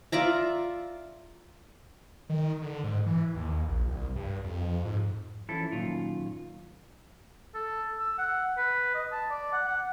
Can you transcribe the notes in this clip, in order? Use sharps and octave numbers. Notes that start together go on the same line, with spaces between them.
F4 D5 E5 A#5
D#3
D3
G#2
E3
D#2
A#1
C2
G2
F2
G#2
E3 F3 C#4 E4 A4
F#2 A#2 D#3 F4
A4
E6
F#5
B4
D#5
A5
D5
F#5
F#5